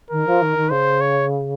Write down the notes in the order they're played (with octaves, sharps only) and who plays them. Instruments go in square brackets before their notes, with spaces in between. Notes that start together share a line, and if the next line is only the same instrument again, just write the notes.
[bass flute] D#3 [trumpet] A#4
[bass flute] F3
D#3
D#3
[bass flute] C#3 [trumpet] C5
[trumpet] C#5